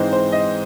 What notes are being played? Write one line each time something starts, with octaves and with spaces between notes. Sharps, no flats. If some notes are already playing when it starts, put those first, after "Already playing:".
Already playing: G#2 E3 G#3 C4 D#4 C5
C5
D#5